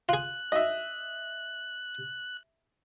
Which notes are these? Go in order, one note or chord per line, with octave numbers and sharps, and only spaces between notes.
F4 G#4 F#6
D#5 E5